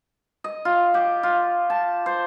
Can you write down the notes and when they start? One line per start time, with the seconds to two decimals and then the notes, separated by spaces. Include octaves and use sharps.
0.44 D#5
0.65 F4
0.94 G4
1.23 F4
1.70 A5
2.06 C5